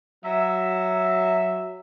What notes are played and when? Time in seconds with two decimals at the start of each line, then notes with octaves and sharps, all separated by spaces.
0.25 F#3 E5